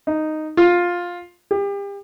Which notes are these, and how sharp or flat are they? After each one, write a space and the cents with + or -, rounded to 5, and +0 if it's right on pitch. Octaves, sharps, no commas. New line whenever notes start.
D#4 -5
F4 +10
G4 +35